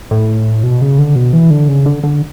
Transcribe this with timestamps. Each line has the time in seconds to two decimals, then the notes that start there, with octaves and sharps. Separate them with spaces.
0.11 A2
0.63 B2
0.81 C#3
0.98 D3
1.16 B2
1.33 E3
1.50 D3
1.68 C#3
1.86 D3
2.03 D3